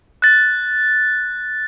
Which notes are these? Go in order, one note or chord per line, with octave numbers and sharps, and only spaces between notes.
F#6 A6